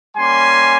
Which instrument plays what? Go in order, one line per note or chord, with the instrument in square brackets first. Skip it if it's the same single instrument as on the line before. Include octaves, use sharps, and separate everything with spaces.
[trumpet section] G3 A#3 C#4 G#5 C6